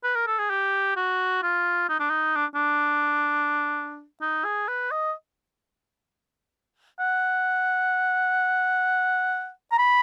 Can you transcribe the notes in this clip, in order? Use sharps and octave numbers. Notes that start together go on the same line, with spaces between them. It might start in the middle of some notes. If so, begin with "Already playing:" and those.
B4
A#4
A4
G#4
G4
F#4
F4
D#4
D4
D#4
D4
D4
D#4
G#4
B4
D#5
F#5
A#5
B5